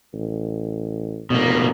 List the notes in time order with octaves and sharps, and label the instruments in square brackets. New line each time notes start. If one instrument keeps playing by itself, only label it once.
[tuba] A1
[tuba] F1 [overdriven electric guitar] B2 A#3